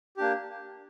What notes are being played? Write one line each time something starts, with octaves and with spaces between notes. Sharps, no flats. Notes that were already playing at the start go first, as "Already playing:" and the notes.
A#3 D4 G4